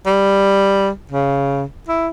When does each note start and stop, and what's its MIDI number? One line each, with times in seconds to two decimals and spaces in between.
0.06 0.90 55
1.11 1.64 49
1.88 2.08 64